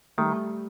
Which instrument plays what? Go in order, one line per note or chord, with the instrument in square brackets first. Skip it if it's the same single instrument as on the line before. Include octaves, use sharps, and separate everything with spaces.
[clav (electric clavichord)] D#3 [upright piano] G3 A3